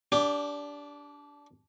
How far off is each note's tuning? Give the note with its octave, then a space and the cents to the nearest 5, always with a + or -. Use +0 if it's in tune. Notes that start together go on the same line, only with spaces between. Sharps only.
D4 -20 G4 +10